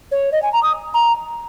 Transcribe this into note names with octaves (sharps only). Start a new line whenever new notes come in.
C#5
D#5
G#5
A#5
D#6
A#5